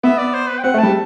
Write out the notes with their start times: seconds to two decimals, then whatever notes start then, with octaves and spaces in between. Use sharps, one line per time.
0.03 B3 E5
0.18 D5
0.34 C5
0.49 B4
0.59 G5
0.63 C4 F#5
0.74 A3
0.78 G3 A5